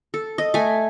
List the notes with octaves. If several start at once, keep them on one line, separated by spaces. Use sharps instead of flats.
A4
D#5
A3 G#5